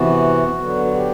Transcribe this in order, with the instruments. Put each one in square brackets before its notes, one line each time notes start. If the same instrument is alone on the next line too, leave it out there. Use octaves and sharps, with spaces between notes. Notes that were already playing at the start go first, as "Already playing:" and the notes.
Already playing: [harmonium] C3 E3 B3 F#4
D3 F#3 B3
F#4
G4